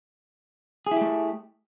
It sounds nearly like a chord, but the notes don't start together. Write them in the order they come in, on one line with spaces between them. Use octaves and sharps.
G#4 E4 G4 A3